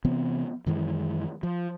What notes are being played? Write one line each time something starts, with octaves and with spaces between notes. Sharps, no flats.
C3 E3 B3 C4
F#2 D#3 E3 G#3
F3